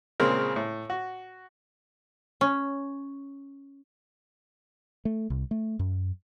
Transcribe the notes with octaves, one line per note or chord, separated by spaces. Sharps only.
A#2 C#3 G#3 C4 A#4
A2
F#4
C#4
A3
C2
A3
F#2